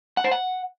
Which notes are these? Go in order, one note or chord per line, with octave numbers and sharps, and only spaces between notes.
F#5
C5
F#5